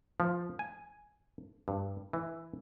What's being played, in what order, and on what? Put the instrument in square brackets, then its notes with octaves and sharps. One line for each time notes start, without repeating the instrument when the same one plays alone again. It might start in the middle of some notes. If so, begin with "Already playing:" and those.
[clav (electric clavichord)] F3
G#5
G2
E3